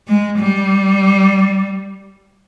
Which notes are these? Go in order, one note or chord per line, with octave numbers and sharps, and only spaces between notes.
G#3
G3